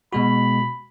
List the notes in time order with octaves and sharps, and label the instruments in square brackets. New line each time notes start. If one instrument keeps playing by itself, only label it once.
[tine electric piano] B2 G#3 F#4 [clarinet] B5